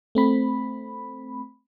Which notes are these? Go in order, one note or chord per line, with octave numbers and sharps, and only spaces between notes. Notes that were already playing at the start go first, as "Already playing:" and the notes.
A3 C4 B5